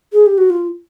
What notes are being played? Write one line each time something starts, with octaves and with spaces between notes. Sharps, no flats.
G#4
G4
F#4
F4